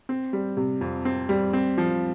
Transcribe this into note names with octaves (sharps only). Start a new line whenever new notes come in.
C4
G3
C3
F2
C4
G3
C4
F3